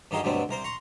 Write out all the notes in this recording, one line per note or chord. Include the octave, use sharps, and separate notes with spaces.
G2 D#3 F#3 D#4 G#4 F5
D2 G2 B2 F#3 C4
C2 A#4 C5
A#5 C6 C#6